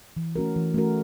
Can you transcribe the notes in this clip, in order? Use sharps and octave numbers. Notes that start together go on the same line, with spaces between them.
E3
A3 C#4 F#4 A#4
E3
A3 C#4 F#4 A#4